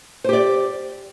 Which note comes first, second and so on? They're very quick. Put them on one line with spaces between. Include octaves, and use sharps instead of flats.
C5 G4 D5